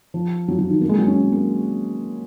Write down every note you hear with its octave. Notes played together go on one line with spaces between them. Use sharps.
F3
F#3
F#3
D#3
A#3
G#3
F#3
C#4
A#3